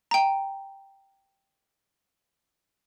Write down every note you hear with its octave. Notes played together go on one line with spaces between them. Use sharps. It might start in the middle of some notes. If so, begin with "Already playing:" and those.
G5 A#5